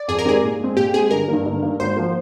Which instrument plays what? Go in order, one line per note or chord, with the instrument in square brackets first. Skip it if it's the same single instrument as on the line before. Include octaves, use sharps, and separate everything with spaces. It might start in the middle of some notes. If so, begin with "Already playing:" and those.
Already playing: [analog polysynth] D5
[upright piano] F2 [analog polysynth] G#4
[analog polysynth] A#4
[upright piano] D#3 G#3 C4 G4 [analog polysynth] G#4
[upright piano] A#2
G#3 C4
[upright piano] A#2 [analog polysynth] G4
[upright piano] G#3 C4 [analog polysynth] G#4
[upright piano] G1 [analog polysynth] A#4
[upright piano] G2 D#3 A#3
G1
G2 D#3 A#3
[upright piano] G#1 [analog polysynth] C5
[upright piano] F3 A#3